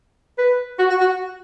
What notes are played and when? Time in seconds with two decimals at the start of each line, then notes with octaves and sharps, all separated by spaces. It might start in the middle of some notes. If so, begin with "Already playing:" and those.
0.38 B4
0.79 F#4
0.90 F#4
1.00 F#4